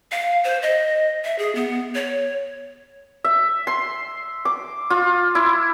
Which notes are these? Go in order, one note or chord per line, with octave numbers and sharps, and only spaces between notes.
F5
C5
D#5
E5
G#4
B3
C#5
E5
C6
D6
F4
E4